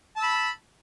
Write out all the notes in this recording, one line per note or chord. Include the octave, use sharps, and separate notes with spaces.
A5 B5 E6